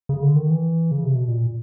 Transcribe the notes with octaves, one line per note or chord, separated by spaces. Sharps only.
C#3
D3
D#3
E3
C#3
C3
B2
A#2